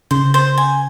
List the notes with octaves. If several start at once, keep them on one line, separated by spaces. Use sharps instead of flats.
C#3 C5
C5
G#5